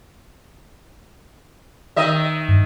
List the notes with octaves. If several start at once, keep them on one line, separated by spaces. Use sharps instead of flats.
D#3 D#5 E5
G2